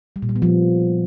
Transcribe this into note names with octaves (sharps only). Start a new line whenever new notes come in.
G3
A#2
G3
B3
F3